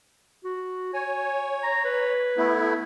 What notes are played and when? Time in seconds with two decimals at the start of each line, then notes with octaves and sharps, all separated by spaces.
0.44 F#4
0.94 C#5 G#5
1.63 A#5
1.84 B4
2.37 A3 B3 E4